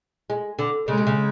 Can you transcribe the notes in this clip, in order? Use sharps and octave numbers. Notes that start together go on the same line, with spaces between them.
G#3
D3
C#3 G#3
C3
C#3